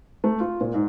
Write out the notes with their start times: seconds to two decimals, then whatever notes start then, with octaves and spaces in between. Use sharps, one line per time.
0.24 A3
0.40 F4
0.61 A#2
0.74 G#2